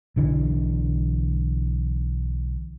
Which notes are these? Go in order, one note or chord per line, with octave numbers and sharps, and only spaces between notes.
B1 D3 E3